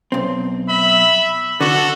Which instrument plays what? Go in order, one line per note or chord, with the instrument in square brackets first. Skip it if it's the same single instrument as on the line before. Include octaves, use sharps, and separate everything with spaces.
[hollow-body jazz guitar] B1 C4
[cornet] E5 [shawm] B5
[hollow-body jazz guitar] D3 [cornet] F#4 [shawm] A4